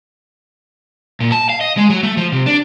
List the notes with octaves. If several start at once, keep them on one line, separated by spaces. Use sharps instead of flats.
A#2
A5
F5
D#5
G#3
F#3
A3
F3
C3
D4